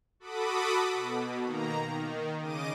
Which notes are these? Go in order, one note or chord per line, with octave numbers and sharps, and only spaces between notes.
F#4 A4 B5 D6 D#6
B2
D#3 A#3 A#5
D#3
C#3 D#5 D6 D#7